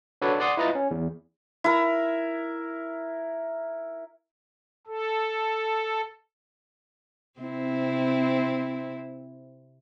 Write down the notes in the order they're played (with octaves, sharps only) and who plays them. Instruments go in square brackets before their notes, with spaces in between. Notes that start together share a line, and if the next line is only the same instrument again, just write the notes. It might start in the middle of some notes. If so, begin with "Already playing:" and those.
[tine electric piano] D4 F#4 A4 B4 C#5 D5
D5 F#5 C6 D#6
E4 F4 B4 D#5 A#5 A6
C#4
E2
[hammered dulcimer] E4 A#4
[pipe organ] A4
[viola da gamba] C3 C4 E4